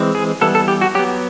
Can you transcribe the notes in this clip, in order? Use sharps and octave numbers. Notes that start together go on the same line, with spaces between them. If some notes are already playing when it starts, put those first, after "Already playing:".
Already playing: E3 G#3 C4
G#4
E3 G3 B3 A4
A4
G4
F#4
F#3 B3 G4